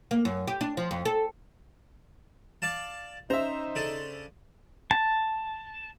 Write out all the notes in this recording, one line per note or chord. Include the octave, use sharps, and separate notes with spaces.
A#3
F#2
G4
D4
F3
F2
A4
D5 F5 A5
C#4 D#4 C5 E5 A#5
C#3 D4 A4
A5